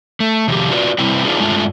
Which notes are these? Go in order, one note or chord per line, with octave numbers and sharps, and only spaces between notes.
A3
C3 D#3 F3 G4
D4 F4 F#4 B4 D5
C3 G3 C4 E4 B4 G5
D4 D#4 F4 G#4 B4
G2 G#3 A3 D4 F4